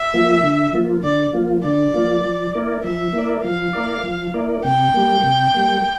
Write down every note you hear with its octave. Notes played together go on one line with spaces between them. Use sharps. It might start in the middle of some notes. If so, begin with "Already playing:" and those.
Already playing: E5
F3 A#3 F4
D3
F3 A#3 F4
D3 D5
F3 A#3 F4
D3 D5
F3 A#3 F4
F3
A#3 E4 A#4 D5
F3 E5
A#3 E4 A#4 D5
F3 F5
A#3 E4 A#4 D5
F3
A#3 E4 A#4 D5
C3 G5
G3 A#3
C3
G3 A#3